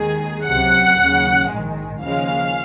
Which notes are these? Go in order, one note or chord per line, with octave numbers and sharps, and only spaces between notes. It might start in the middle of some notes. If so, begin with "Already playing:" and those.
Already playing: D#2 D#3 G#3 G#4
C#2 C3 F#3 F#5
D#2 C#3 F#3
A#1 G#2 D#3 G#3
D#2 C#3 F3 G#3 F5